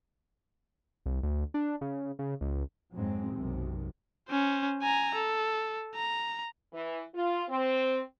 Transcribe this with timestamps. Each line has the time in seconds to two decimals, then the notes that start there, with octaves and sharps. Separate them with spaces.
1.06 C2
1.23 D2
1.54 D4
1.81 C#3
2.19 C#3
2.41 C#2
2.93 G#1 F2 G#2 F#3 G#3 C4
3.32 B1 F#2 C3 D#3
4.29 C#4 C5
4.82 G#5 A#5
5.15 A4
5.95 A#5
6.73 E3
7.13 F4
7.49 C4